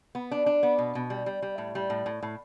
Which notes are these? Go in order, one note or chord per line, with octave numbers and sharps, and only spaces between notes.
B3
D4
D4
B3
B2
B2
G3
G3
G3
A2
G3
A2
A2
A2